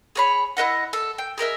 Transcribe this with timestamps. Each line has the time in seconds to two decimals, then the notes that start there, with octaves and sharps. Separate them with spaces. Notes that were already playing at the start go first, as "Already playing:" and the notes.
0.15 G#4 C#5 B5
0.57 E4 B4 D#5 F#5
0.93 A4
1.18 G5
1.38 G#4 A#4 D#5 E5